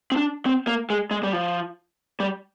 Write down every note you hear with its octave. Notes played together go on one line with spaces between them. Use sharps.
C4
D4
C4
A#3
G#3
G#3
G3
F3
G3